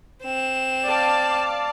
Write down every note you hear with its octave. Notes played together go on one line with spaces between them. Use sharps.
C4 E7
D5 F5 A5